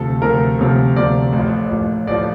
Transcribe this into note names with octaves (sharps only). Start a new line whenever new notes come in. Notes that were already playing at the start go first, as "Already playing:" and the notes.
Already playing: D2 C3 F3 A4
D2 C3 F3 A#4
D2 C3 F3
D2 C3 F3 D5
A1 A2 F3
A1 A2 F3
A1 A2 F3 D5